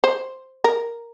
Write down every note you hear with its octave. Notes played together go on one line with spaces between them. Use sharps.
C5
A#4